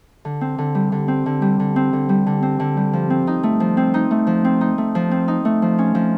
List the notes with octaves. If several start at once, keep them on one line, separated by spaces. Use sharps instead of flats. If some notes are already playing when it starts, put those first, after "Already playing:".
D3
C4
D3
G3
D3
C4
D3
G3
D3
C4
D3
G3
D3
C4
D3
G3
F3
C4
D#4
A3
F3
C4
D#4
A3
F3
C4
D#4
A3
F3
C4
D#4
A3
F3
C#4
F3